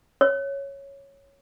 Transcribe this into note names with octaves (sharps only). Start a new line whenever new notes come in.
C#5